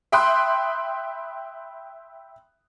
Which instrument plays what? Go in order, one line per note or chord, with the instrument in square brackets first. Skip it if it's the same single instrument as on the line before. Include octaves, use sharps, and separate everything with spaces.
[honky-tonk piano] E5 G5 B5 C6 D#6 F#6